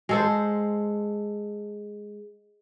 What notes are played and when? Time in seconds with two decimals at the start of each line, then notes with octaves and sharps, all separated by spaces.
0.09 G#3 A4 C5